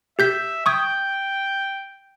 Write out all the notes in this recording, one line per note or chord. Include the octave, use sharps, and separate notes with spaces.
G4 E5 G6 B6
G5 C#6 D#6 G#6